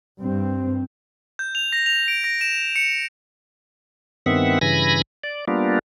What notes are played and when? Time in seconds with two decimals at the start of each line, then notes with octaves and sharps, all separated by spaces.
0.20 G2 C4
1.39 G6
1.55 F7
1.73 A#6
1.86 F7
2.08 D7
2.24 A#6
2.41 E7
2.76 C#7
4.26 G2 D#3 B3 C4 E5 F#5
4.61 G2 C#3 E3 G#5 B5 A#6
5.23 D5
5.48 G3 A#3 B3 D4 F4